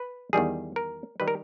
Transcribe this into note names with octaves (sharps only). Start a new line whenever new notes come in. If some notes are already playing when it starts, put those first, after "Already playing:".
Already playing: B4
E2 D#3 G3 G#4
A#4
D#3 G3 B4
A#4